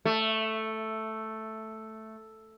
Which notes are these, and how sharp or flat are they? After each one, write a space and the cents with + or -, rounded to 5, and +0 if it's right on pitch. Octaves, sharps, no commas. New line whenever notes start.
A3 +0